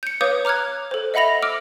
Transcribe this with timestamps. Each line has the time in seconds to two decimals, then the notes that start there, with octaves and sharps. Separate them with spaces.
0.03 G6 C#7
0.21 B4 C#5 F5 D6 D#6 G6
0.45 A#5 D6 F6 F#6 G#6
0.91 A4 C5
1.14 D#5 E5 F#5 B5 A#6 F7
1.42 D6 E6 F6 D7